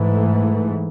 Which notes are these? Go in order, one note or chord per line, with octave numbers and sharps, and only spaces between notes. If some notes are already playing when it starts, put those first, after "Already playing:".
Already playing: G#2 E3 A3